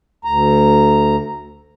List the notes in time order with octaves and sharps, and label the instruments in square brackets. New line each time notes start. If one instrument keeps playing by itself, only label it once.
[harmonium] D2 A#5